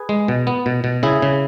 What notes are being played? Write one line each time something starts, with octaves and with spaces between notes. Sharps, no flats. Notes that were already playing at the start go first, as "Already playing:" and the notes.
Already playing: G#4 B4
G#3
B2
B3
B2
B2
C#3 E4 G#4
C#3